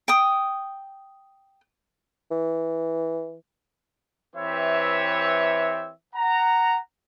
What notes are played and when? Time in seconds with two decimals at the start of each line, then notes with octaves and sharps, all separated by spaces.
0.08 G5 D#6
2.31 E3
4.36 E3 C4 G4 B4 C#5 E5
6.15 F#5 A#5